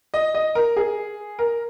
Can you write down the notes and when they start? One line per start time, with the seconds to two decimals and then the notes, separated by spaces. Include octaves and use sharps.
0.14 D#5
0.35 D#5
0.55 A#4
0.77 G#4
1.39 A#4